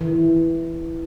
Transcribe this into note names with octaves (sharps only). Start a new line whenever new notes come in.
E3